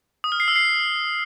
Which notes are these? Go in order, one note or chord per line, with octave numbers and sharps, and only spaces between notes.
D#6
F6
C7
E6
C7